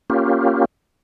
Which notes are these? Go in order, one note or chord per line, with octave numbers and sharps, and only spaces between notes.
A#3 C#4 F4 G4